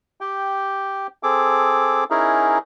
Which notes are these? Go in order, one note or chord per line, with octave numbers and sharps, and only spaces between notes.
G4 G5
C4 G#4 A4 D6
C#4 D#4 E4 G#4 A#4